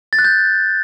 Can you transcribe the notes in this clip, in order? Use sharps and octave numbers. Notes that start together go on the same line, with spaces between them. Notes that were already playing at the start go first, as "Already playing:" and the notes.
A6
F#6
G6